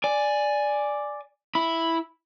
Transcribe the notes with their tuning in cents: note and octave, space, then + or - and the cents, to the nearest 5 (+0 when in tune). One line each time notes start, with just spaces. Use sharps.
D5 +0 G#5 +0
E4 +0 B5 +0